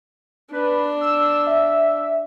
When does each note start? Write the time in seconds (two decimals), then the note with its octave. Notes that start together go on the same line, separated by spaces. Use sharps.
0.52 D4 B4
1.01 E6
1.47 E5